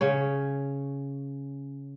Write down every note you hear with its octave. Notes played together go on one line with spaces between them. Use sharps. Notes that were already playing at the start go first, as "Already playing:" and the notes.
C#3 C#4 C#5